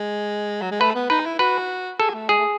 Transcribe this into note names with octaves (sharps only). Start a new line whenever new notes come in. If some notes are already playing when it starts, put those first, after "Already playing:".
Already playing: G#3
F#3
G#3
A3 B4
B3
D#4 B4
E4
F#4 B4
G#4 A4
A3
G#3 G#4
A3